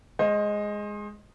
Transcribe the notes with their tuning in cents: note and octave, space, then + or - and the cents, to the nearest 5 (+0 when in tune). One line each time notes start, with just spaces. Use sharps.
G#3 +0 C5 +30 D#5 +0